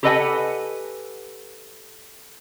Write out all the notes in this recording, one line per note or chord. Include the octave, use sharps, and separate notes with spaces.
G4 A4 B4 D#5 F#5 G#5